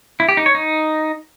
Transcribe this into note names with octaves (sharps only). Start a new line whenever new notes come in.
E4
G4
D#4
C#5
D#4